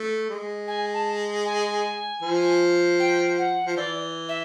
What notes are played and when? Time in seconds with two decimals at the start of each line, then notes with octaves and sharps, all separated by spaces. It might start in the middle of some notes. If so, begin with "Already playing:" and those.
Already playing: A3
0.30 G#3
0.68 G#5
0.93 A5
1.45 G#5
2.22 F3
3.00 G5
3.38 F#5
3.66 F3
3.77 E3 D5
4.29 E5